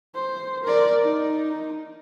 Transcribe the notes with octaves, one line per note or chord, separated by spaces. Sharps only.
C5
A#4 D5
D#4